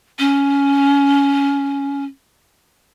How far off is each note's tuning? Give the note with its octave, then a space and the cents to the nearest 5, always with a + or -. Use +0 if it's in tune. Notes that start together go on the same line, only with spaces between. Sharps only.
C#4 +15